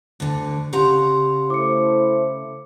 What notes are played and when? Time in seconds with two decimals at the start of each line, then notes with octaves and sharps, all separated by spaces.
0.20 D2 D3
0.73 C#3 G4 F#5 A#5 C6
1.50 A3 E4 C5 D6 C#7